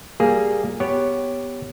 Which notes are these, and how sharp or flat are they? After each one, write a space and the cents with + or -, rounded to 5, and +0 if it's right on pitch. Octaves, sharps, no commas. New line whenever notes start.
G3 +0 A#3 +0 G#4 +0
B3 +0 G4 +0 C#5 +0